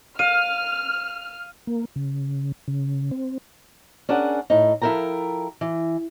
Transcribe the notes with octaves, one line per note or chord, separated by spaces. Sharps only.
F5 F6 D#7
A#3
C#3
C#3
C4
C#4 D4 G#4 A#4 F#5
A2 D#4
F3 E4 A4 A#4 G5 A#5
E3